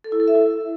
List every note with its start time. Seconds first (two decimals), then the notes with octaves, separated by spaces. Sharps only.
0.04 A4
0.12 E4
0.20 A4
0.28 E5
0.35 E4